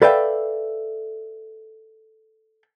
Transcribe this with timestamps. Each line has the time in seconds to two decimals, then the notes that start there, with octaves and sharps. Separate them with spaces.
0.02 A4 B4 D5 E5 F5 G5